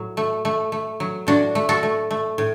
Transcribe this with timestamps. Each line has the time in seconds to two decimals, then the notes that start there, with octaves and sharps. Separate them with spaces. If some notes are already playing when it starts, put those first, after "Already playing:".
Already playing: A2 F#3
0.17 A3
0.45 A3
0.72 A3
1.00 F#3
1.27 A2 D4 F#4
1.55 A3
1.69 F#4 A4
1.83 A3
2.11 A3
2.38 A2